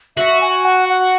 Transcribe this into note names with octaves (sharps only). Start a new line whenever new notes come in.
F#4 E5
G#5
F#5
F#5